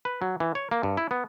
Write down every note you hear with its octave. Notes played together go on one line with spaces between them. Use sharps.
B4
F#3
E3
C#5
A#3
G2
E4
B3